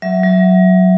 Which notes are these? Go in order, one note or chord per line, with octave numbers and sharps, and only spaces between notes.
F#3 E5
F#3